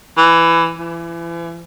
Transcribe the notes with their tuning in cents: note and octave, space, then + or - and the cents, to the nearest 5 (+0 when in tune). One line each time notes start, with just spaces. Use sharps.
E3 +15
E3 +35